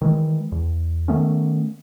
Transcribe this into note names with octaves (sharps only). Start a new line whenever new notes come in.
D#3 E3 G#3
E2
D#3 A3 B3 C#4